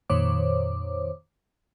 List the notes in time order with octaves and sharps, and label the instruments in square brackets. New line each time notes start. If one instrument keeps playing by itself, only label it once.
[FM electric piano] F2 A#2 D#3 C5 C#5 D6